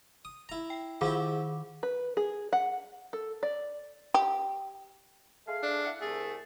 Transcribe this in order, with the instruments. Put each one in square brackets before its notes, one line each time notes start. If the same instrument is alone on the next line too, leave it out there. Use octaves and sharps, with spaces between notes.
[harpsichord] D#6
E4 A#5
[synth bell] G5
[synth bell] D#3 G#4 D6 [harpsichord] F3 E4 G4
[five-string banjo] B4
G#4
F#5
A4
D5
[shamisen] G4
[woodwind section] A3 G#4 F5
[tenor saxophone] D4
[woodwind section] E4 E5 F#5
[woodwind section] C2 A3 [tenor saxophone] G#4